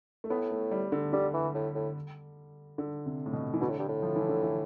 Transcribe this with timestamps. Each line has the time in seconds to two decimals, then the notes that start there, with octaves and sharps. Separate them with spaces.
0.24 A3
0.30 A2 B3
0.51 A3
0.71 G3
0.92 D3
1.13 D3 G3
1.34 E3
1.54 A2
1.75 A2
2.78 D3
3.06 C3
3.26 A2
3.33 B2
3.54 E3
3.61 B2 D3
3.70 A2
3.79 G2
3.88 A2
4.02 F3
4.16 E3
4.29 D3
4.43 E3